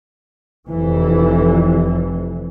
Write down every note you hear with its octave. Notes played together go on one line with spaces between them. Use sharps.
F1 F2 E3